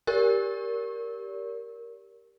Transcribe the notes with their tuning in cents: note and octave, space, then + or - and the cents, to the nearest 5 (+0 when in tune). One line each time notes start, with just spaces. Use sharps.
G4 +0 A#4 +0 D5 -45